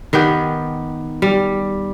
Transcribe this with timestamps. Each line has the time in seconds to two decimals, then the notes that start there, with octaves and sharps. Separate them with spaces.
0.13 D#3 B3 G4 G5
1.22 G3